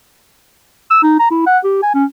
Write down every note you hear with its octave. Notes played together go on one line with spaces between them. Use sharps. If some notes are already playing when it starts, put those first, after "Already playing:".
E6
D#4
A#5
E4
F#5
G4
G#5
C#4